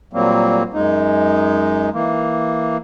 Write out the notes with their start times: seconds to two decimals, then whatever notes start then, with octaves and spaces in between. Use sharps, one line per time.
0.13 A#2 F#3 G3 A#3 C4
0.74 F#2 G#3 D#4
1.93 E3 A#3